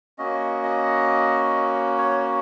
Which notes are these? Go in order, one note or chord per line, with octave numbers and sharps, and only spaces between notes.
A#3 C#4 F#4 D#5
D#5
C#5